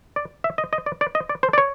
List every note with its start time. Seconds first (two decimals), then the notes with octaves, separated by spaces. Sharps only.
0.16 D5
0.44 E5
0.58 D#5
0.73 D#5
0.86 D5
1.01 D5
1.15 D#5
1.29 D5
1.43 C5
1.53 D5
1.58 C#5